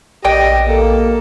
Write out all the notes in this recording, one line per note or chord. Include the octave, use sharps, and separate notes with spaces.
A#1 B2 G4 D5 D#5 G5
A#3 A4